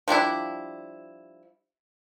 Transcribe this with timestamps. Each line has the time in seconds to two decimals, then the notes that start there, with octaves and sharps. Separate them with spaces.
0.08 F3 G3 D4 E4